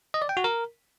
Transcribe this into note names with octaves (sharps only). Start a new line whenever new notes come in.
D#5
D5
G5
F#4
A#4